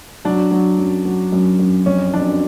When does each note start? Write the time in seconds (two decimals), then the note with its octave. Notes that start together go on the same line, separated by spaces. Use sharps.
0.25 F#3 D4
0.51 F#3
0.78 F#2
1.06 F#3
1.32 F#2
1.59 F#2
1.86 F2 C#4
2.13 F2 D4